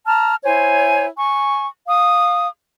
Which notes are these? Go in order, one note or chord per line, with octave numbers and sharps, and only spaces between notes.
A5 A#5 F6
E4 C5 C#5 G#5
G#5 C#6
F5 D#6